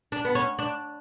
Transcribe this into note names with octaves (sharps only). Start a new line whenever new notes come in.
D4
B3
C#4
D4